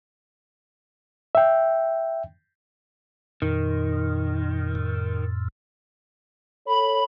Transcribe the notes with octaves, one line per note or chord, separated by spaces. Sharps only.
E5 G5
F2 A#2 D#3
F2 A2
A4 C#5 B5